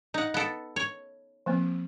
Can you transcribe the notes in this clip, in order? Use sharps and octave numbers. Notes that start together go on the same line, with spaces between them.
D#4 F#5
B3 A4
C#5
F3 A#3 C4